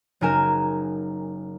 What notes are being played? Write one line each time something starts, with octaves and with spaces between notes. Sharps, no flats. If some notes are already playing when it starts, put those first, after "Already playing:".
F#1 F#3 D#4 A#4 G#5 E7